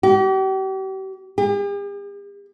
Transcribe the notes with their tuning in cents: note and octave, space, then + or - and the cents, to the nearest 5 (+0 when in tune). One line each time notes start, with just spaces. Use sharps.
G4 -40
G4 +45